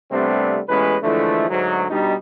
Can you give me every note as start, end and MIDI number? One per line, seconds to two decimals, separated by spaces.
0.11 0.60 48
0.11 0.60 55
0.11 0.60 57
0.11 0.60 59
0.11 0.60 60
0.11 0.60 62
0.69 0.96 33
0.69 0.96 40
0.69 0.96 56
0.69 0.96 61
0.69 0.96 71
1.03 1.48 50
1.03 1.48 52
1.03 1.48 53
1.03 1.48 56
1.03 1.48 57
1.50 1.85 38
1.50 1.85 44
1.50 1.85 54
1.91 2.15 47
1.91 2.15 55
1.91 2.15 62
1.91 2.15 63